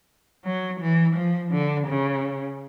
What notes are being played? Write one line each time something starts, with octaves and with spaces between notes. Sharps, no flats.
F#3
E3
F3
D3
C#3